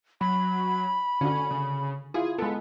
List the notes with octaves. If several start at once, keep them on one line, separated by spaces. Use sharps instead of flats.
F#3 B5
D3 C#4 D4 F#4
C#3
E4 F4 G#4
G#3 B3 A4